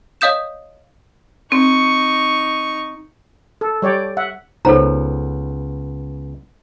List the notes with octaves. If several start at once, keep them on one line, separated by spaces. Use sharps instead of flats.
C#5 D#5 F5 D#6 G6 E7
C4 D#4 C#6
A4
G3 C#5 D5 G5
E5 F#5
C#2 B3 D#4 A4 C5 C#5 A#5